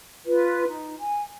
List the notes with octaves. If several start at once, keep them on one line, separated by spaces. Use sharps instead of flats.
F4 B4
D#4
G#5